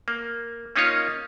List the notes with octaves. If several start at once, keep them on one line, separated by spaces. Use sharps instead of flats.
A#3
A#3 C#4 D#4 F4 C#5